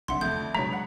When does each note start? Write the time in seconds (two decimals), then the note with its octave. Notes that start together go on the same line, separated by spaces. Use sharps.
0.08 F#1 C2 D3 E5 F#5 C6
0.21 F2 A3 G6
0.33 D3
0.55 B2 F#3 G#3 D4 C#5 A#5 B6
0.71 F#5 B5